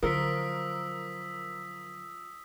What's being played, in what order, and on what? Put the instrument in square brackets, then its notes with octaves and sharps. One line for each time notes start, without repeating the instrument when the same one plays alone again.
[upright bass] D3 F#3 [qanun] F3 [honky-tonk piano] A#4 [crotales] D#6 E6 B6